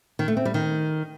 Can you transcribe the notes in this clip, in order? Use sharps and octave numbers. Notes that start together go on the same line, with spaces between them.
D#3
A3
C4
G3
D#3